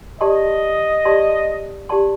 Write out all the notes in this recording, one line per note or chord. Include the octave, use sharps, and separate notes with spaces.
G4 D5 D#5 A5 C6
G4 D5 A5 C6
G4 D5 A5 C6